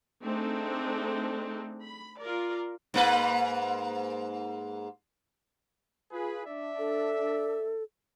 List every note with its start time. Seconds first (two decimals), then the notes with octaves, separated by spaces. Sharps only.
0.22 A3 C4 D4 D#4 G#4 A4
1.82 B5
2.19 F4 A#4 D5
2.94 G#2 A#3 B4
6.12 F4 G#4 B4
6.46 D4 D5 E5
6.79 A4